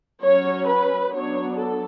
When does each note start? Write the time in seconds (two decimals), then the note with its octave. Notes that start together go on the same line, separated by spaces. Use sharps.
0.22 F#3 C#4 C#5
0.67 B4
1.12 F#3 B3 D4 C#5
1.56 A4